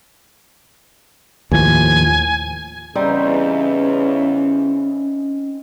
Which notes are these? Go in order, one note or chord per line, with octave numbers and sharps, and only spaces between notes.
D#2 A2 F3 G#5
E2 C#3 G3 C4 C#4 D#4